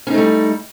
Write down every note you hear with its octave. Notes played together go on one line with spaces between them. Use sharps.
G3 A3 C#4 D#4